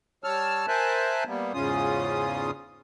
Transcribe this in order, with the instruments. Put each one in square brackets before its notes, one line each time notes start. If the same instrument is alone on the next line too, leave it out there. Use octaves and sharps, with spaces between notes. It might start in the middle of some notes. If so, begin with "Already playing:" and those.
[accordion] G3 C#5 A5 E6 F6
A#4 C5 E5 G#5 A5 F#6
G3 A#3 B3
E2 G#2 C#3 C#4 F4 D#6